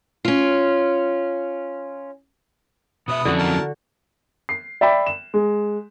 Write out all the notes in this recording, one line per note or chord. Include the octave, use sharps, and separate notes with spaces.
C#4 F4
B2 B4 C#5 E5 D#6
F2 D3 F#3 C#4 E4 F#4
A#4 A5
C7
D5 E5 G5 B5
E7
G#3